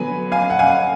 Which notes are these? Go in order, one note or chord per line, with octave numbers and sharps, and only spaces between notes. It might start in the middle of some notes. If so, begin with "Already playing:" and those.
Already playing: D3 F#3 B3 G#5 B5
F5 G#5
F#5
F5 G#5